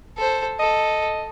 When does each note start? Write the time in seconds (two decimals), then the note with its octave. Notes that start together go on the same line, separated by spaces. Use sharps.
0.18 A4 C5
0.60 A4 D#5